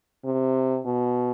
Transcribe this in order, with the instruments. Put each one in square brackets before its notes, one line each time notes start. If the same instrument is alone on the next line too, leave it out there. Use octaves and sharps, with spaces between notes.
[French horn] C3
B2